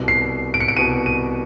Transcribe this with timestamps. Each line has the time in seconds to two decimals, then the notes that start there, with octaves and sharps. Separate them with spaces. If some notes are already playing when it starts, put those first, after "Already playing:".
Already playing: C2 B2
0.08 C7
0.54 D7
0.60 C#7
0.68 D7
0.77 C2 B2 D#7
1.06 D#7